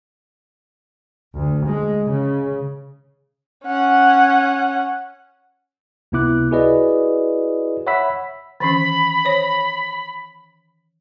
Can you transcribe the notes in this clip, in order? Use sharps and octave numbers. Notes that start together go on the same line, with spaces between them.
D2
G#3
C#3
C#4 F#5
C#2 C3 B3 E4 D6 F#6
E4 F#4 G#4 B4 D5 D#5
C#5 E5 F#5 B5 E6 B6
D#3 E3 C#4 B5
C5 C#5